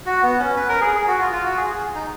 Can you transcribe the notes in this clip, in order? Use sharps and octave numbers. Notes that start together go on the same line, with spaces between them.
F#4
B3
C#4
B4
A#4
G#4
G#4
F#4
F4
F4
F#4
G#4
G#4
D#4